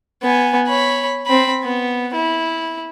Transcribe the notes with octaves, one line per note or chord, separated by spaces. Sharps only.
B3 G#5
C#5 B5
C4 B5
B3
E4